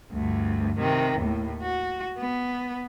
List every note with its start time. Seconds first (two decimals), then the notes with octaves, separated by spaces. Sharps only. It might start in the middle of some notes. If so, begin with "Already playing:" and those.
0.12 D2 G2
0.78 C3 D#3
1.20 D#2 A2
1.62 F#4
2.18 B3